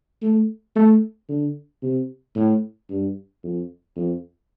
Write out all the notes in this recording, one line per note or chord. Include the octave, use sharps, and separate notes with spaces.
A3
A3
D3
C3
A2
G2
F2
F2